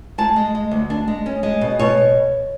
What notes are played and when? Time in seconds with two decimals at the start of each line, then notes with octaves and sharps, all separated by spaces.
0.18 G#3 A5
0.36 G#3
0.55 G#3
0.71 D2
0.90 D4
1.08 G#3
1.26 C#4
1.43 G#3
1.61 B2
1.79 B2 C#5